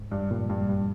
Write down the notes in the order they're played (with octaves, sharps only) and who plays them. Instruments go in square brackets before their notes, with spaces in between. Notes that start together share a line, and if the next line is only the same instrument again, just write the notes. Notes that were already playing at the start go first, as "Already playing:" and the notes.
Already playing: [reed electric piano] G#2
[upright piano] G2
[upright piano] G2 [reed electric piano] A#2
[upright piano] G2
G2